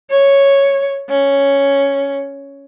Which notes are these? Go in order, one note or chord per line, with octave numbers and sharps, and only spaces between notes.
C#5
C#4